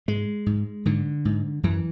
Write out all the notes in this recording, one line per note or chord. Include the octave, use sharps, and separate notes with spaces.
G#2 G#3
G#2
G#2 D3
G#2
F#2 E3